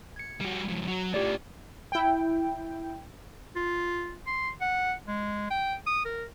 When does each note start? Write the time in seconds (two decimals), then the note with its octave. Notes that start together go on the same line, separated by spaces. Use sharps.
0.16 G#6 C#7
0.41 G3 F#4
0.69 F2 G#2
0.88 F#3
1.14 A2 F3 G4 D5
1.92 E4 G5
3.56 F4
4.27 C6
4.61 F#5
5.07 G#3
5.51 G5
5.87 D#6
6.05 A#4